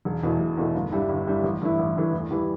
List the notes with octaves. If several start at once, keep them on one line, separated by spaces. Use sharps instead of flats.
E1
E2 B2 A3
E1
E2 B2 A3
G1
G2 G3 E4
G1
G2 G3 E4
A1
G2 E3 A3 E4
A1
G2 E3 A3 E4
E2
E3 G3 E4